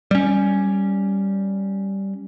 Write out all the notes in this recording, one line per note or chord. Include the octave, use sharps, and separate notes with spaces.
G3 C#4